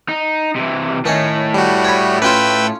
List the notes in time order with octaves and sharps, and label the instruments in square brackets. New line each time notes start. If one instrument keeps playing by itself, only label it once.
[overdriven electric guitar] D#4
C3 E3
[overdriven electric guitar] A2 A3 [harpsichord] D#3 C#4
[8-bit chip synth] G3 F#4
[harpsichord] C#5 B5
[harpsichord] C#4 F4 [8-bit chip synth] B4 G5 E6